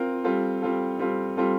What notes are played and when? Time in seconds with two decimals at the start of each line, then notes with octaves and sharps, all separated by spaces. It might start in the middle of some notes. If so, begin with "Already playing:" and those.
Already playing: C4 F4 A#4
0.24 G3 C4 F4 A4
0.62 G3 C4 F4 A4
0.99 G3 C4 F4 A4
1.37 G3 C4 F4 A4